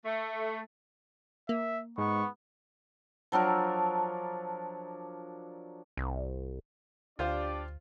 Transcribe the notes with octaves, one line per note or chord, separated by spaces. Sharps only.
A3
A#3 E5
G#2 B3 C#6
F3 F#3 D4 A#4
C2
D2 D4 F4 G4 C5 D5 F5